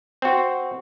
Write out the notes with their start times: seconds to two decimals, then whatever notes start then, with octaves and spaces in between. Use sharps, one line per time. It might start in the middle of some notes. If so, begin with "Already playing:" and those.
0.22 C4 F#4